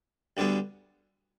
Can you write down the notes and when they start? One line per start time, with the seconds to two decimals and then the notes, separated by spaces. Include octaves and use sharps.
0.37 D2 D3 G3 B3